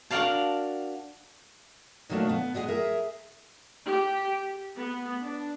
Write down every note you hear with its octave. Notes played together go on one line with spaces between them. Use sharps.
D4 F#4 A#4 D5 F5 A5
B2 D#3 F#3 A3 A#3 D4
B3
G3 G#3 B3 E4 G#4
G#4 A#4 E5
G4
B3
D4